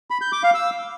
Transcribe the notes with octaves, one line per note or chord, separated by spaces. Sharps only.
B5
G6
D6
F5
E6